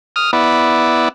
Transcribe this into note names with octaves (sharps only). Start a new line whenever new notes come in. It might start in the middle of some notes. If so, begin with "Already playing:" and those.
D#6 F6
B3 E4 D5